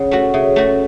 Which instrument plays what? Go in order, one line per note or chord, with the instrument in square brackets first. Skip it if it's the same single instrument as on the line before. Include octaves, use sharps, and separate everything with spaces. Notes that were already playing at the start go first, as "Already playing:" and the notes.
Already playing: [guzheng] C#3 [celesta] C#5 F#5
[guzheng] A3 F#4
[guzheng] C#3 [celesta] E5
[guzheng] A3 F#4